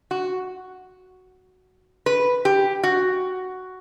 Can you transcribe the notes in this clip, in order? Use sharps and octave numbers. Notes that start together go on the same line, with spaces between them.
F#4
B4
G4
F#4